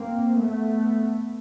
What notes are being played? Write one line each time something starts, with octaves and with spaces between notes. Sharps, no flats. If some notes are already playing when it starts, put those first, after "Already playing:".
Already playing: A#3 C4
A3 B3